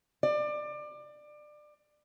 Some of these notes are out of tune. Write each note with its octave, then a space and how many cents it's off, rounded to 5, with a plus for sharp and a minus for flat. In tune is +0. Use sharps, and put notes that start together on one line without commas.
D5 +25